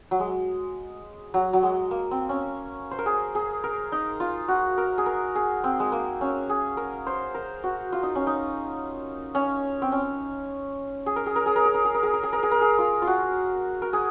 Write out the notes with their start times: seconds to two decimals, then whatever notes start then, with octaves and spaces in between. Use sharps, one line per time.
0.11 F#3
0.20 G#3
1.34 F#3
1.53 F#3
1.63 G#3
1.91 A#3
2.11 C4
2.29 C#4
2.91 C5
2.99 A#4
3.06 G#4
3.35 G#4
3.64 A#4
3.92 D#4
4.20 F4
4.48 F#4
4.78 A#4
4.98 G#4
5.06 A#4
5.35 G#4
5.64 C4
5.80 G#3
5.92 A#3
6.21 C#4
6.49 G#4
6.77 A#4
7.07 C5
7.34 A#4
7.64 F#4
7.92 F4
8.03 D#4
8.15 C#4
8.27 D#4
9.35 C#4
9.82 C4
9.92 C#4
11.06 G#4
11.16 A#4
11.26 G#4
11.36 A#4
11.46 G#4
11.56 A#4
11.65 G#4
11.74 A#4
11.85 G#4
11.94 A#4
12.03 G#4
12.14 A#4
12.23 G#4
12.33 A#4
12.43 G#4
12.51 A#4
12.61 G#4
12.78 F4
13.02 F4
13.07 F#4
13.82 A#4
13.93 G#4